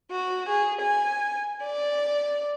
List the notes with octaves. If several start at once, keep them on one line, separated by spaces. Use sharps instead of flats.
F#4
G#4
G#5
D5